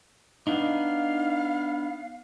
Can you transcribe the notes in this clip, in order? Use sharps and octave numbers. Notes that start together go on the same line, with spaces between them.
B3 D4 D#4 F5